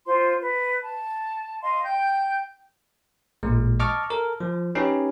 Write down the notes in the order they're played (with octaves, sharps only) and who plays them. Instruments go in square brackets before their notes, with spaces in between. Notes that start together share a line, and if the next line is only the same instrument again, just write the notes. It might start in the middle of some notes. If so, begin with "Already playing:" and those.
[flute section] F4 C5 C6
B4
A5
D#5 F5 C6
G5 G6
[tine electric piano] A1 A#2 G#3
D#5 A5 C#6 D6 F6
A4 A#4
F3
C#4 D#4 G4 B4